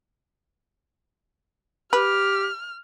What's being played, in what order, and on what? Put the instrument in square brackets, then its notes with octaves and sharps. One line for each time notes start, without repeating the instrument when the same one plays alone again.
[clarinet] G4 [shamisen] B4 [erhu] F6